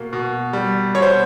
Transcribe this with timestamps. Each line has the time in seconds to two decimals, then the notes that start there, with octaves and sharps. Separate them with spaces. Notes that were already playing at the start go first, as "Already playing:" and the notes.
Already playing: B2 A#3
0.13 B2
0.53 G3
0.94 B2 C#5
1.02 C5